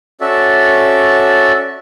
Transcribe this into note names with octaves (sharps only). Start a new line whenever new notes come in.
C#4 F#4 A4 D5 E5